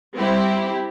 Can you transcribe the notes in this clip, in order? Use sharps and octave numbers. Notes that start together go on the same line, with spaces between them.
G3 C4 E4 G4